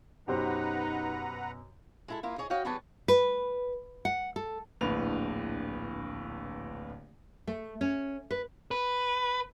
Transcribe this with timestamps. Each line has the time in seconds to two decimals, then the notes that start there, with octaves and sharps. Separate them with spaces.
0.28 F#2 B2 D#4 G4 B4 C5 F#5 A#5
2.08 G#3 E4 A4
2.23 A#3 E4 F4
2.38 G#4 C#5 D#5
2.50 F#4 C#5 D#5 F5 G5
2.65 E2 G3 B3 B4 C#5 A5
3.08 B4
4.05 F#5
4.36 A4
4.81 D1 A#1 A2 D3 B4 F7
7.47 A3
7.81 C#4
8.31 B4
8.71 B4